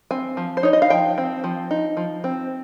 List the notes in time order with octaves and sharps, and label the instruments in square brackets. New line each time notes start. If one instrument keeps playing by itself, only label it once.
[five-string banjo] C4 G#5
F3
C5
D#4 C#5
D#5
F5
F3 G5
C4
F3
D#4
F3
C4